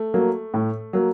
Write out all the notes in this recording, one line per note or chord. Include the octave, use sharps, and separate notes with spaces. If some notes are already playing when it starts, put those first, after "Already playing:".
Already playing: A3
F#3 A#3
A2
F#3 A#3